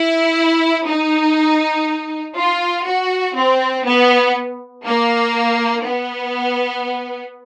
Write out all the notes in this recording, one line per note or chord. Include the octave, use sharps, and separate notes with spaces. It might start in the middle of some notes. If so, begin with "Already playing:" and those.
Already playing: E4
D#4
F4
F#4
C4
B3
A#3
B3